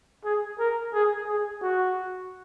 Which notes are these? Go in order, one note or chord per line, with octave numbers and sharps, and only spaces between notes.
G#4
A#4
G#4
G#4
F#4